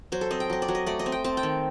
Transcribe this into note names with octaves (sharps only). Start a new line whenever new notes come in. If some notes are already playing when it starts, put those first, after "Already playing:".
F#3 C5
A4
C4 D#5
G5
F#3 D#5
D5
F#3
D#5
A3 D5
D#5
C4
G5
C4 A5
G5
D#3